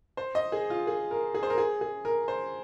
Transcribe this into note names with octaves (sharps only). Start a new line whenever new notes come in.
C5
D#5
G#4
F4
G#4
A#4
G#4
C5
A#4
G#4
G#4
A#4
C5